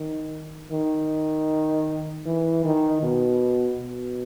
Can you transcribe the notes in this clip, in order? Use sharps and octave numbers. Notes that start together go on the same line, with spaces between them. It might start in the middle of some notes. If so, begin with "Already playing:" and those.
Already playing: D#3
D#3
E3
D#3
B2
B2